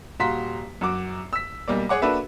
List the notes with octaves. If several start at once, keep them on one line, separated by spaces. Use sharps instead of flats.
D#1 F#4 F5 A#5 C6 B6
F#2 F#4 D6
E6 B6
B1 G3 A#3 D5
G#4 C#5 F#5 D6
A#3 D4 F#4 A4 B4 E5